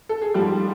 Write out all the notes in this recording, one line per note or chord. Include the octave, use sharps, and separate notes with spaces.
A4
G#4
G#2 F3 G3 G4